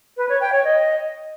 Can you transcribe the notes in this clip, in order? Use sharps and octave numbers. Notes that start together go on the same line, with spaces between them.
B4
C#5
G5
C#5
D#5